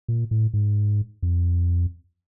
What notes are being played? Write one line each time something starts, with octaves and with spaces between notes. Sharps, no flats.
A#2
A2
G#2
F2